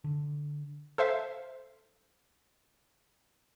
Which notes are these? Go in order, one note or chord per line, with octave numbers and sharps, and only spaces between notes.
D3
A4 C5 E5 F5